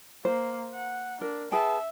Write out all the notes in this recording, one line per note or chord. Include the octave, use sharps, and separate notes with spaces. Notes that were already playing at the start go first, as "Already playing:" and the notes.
A#3 C5
F#5
D4 A#4
G#4 B4 E5 G5 A5